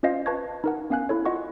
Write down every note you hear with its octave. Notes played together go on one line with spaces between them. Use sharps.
C#4 F4 C5 D#5 F5
B4 A5 C#6 G#6
D#4 A#4 F#5
B3 C#4 F5 G#5 F#6
E4 A4 C#5
F4 D#5 F#5 C#6